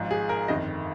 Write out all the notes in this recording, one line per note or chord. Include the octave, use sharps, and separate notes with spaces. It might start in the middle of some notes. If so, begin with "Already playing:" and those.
Already playing: G#1 G#2 F3
G#4
A#4
G1 F2 D#3 D#5